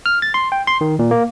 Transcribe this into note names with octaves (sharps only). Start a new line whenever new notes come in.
F6
A6
C6
G5
C6
D#3
A#2
A#3